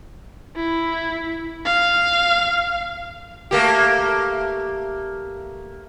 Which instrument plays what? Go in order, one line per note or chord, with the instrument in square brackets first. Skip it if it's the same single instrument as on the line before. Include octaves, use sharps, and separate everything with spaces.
[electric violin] E4
F5
[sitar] A3 A#3 G4